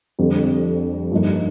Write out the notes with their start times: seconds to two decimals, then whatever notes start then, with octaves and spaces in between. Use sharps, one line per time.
0.19 F2 D3 G3
1.12 G2 F3 A#3 D#4